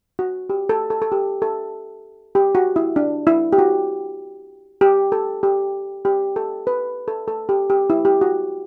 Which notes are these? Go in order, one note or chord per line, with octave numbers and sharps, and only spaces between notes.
F#4
G4
A4
A4
A4
G4
A4
G4
F#4
E4
D4
E4
G4
F#4
G4
A4
G4
G4
A4
B4
A4
A4
G4
G4
E4
G4
F#4